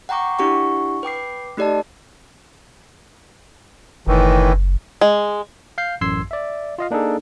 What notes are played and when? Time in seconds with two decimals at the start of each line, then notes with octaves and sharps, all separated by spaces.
0.09 F#5 G5 A#5 C#6 D6
0.39 D4 E4 G4 F#5 C#6
1.03 B4 G5 D6 C7
1.57 A3 D#4 G4 D5 D#5 A5
4.07 F#1 A2 D#3 E3
5.01 G#3
5.78 F5 G6 C7
6.01 A1 F#2 C6 E6 G#6 C7
6.31 D5 E5
6.78 F4 D#5 F5
6.91 A#3 D4 D#4 G#4 A4